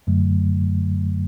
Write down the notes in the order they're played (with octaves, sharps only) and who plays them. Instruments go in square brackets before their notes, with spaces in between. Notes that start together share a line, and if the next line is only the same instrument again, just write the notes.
[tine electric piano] F#2 D3 F#3 A3